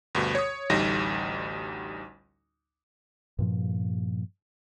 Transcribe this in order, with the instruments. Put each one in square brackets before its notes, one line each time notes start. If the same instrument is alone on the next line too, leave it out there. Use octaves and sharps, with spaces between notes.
[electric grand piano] D2 G2 B2
C#5 D#6
A1 D2 G3 D#4 A#6
[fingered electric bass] G2 A#2 F3